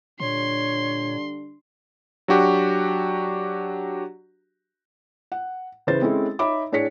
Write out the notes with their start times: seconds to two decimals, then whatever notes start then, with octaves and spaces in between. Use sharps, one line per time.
0.20 A#2 D3 G3 D4 C#5 C6
2.28 F#3 D4 F#4 G4
5.32 F#5
5.87 C#3 E3 B4 C5 A6
6.01 G#3 C4 C#4 E4 A4
6.39 D#4 C#5 E5 B5 D6
6.72 A2 D4 G#4 C#5 B6 C#7